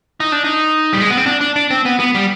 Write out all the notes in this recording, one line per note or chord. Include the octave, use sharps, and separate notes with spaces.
D#4
D4
D#4
G3
G#3
B3
C4
D4
D4
D4
C4
B3
B3
G3